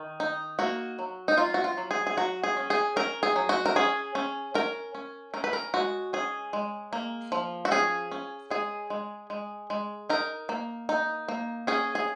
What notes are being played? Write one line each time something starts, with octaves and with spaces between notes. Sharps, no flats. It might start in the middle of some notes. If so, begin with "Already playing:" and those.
Already playing: D#3
D#4
A#3 F#4
F#3
D#4
F#3 F4
F#4
F4
F#3
G#4
G#4
F#3 F#4
G#4
C#4
G#4
C#4 A#4
G#4
F#3
F#4
A#4
C#4 G#4
C#4
C#4 A#4
C#4
C#4 A#4
B4
A#4
G#3 F#4
C#4 G#4
G#3
A#3
F3
F#4
C#4 G#4
C#4
G#3 G#4
G#3
G#3
G#3
D#4 A#4
A#3
D#4
A#3
C#4 G#4
G#4